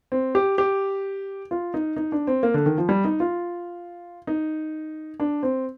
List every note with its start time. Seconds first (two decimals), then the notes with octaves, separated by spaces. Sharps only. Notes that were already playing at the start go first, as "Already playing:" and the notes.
0.12 C4
0.35 G4
0.58 G4
1.51 F4
1.74 D#4
1.96 D#4
2.12 D4
2.27 C4
2.43 A#3
2.54 D3
2.66 D#3
2.78 F3
2.89 G3
3.04 D#4
3.20 F4
4.27 D#4
5.20 D4
5.43 C4